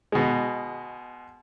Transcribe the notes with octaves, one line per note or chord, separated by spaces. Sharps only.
B2 G#3